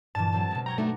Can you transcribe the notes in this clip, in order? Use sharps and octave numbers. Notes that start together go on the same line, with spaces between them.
G2 A#2 E3 A5
F#3 C4 A4
B2 G#3
G5 A#5 C#6 G#6
A3 D4 D#4 F#4